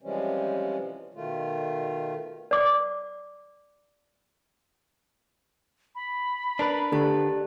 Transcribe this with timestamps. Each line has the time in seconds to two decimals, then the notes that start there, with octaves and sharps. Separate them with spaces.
0.02 C3 E3 F3 G3 G#3 C#4
1.14 B2 D#3 A3 F4
2.51 D5 D6
5.95 B5
6.59 D4 A#4 B4
6.92 D3 A3 G4 A5